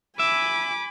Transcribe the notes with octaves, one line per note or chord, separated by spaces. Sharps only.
E5 G#5 B5 D6